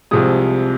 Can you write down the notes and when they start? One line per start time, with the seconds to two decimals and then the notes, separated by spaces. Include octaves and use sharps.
0.11 C2 C3 F3 G#3 D#6